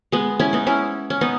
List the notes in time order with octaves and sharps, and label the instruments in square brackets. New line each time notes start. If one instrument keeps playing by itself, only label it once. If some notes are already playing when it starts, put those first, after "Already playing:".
[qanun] G#3 B3
C#4 E4
B3 D#4
C#4 E4
C#4
B3 D#4